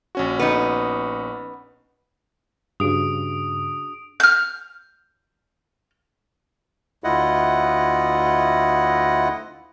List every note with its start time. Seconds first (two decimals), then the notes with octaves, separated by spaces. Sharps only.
0.15 A#1 C#4 F#4
0.39 B3 D#4
2.80 G2 C#3 D4 F#4 G#4 D#6 D7
4.20 F6 G6
7.04 D2 E4 F4 D#5 F#5